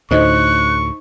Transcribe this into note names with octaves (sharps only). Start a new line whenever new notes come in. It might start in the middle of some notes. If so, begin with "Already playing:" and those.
D2 A2 D#4 C5 D#5 C#6 F#6